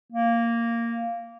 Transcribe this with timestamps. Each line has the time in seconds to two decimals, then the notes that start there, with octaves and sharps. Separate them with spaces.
0.12 A#3